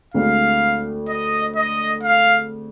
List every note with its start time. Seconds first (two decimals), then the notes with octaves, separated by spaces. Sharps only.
0.14 D2 D3 G#3 C4 F5
1.08 D#5
1.56 D#5
2.03 F5